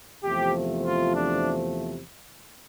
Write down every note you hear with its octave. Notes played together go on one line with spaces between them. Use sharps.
E2 C3 F3 A3 G4
F4
D4